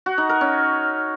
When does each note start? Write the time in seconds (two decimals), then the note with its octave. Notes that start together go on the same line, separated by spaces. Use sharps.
0.06 F#4
0.18 D#4
0.29 A#4
0.41 C#4